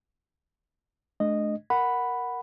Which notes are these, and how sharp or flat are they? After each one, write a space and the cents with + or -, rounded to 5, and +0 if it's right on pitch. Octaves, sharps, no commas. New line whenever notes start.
A3 -45 D4 +0 D#5 -10
A#4 +0 F#5 +0 B5 +0